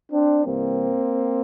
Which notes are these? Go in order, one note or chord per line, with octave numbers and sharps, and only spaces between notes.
C4 D4
C2 C3 E3 G3 A#3 C4